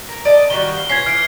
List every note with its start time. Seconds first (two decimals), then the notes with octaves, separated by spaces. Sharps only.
0.09 A#4
0.25 D5 D#5 A5
0.50 D#3 G3 F#4 G7
0.77 F5
0.90 C#4 F4 B4 G#6 C7
1.06 E3 F6 D7